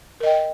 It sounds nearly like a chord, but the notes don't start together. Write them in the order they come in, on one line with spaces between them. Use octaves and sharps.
A#4 D#5 G5